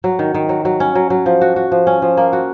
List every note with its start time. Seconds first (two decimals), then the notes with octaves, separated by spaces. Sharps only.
0.04 F#3
0.19 D#3
0.34 D#3
0.49 F#3
0.65 F#3
0.80 C#4
0.95 F#3
1.10 F#3
1.26 F3
1.41 F#4
1.56 F#4
1.72 F3
1.87 C#4
2.02 F3
2.17 A#3
2.33 F#4